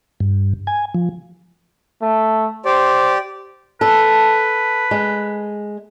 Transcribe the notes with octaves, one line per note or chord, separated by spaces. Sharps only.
G2
G#5
F3
A3
G4 C5 D5
A4 B4
G#3